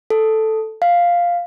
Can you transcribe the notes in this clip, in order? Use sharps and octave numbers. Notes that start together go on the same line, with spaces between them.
A4
F5